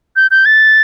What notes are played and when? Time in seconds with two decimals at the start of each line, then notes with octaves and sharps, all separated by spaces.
0.16 G6
0.31 G6
0.46 A6